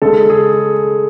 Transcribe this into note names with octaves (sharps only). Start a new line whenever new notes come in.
C#3 G#3 A4
G#4